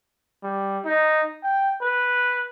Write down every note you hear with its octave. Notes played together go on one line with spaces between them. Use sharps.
G3
D#4
G5
B4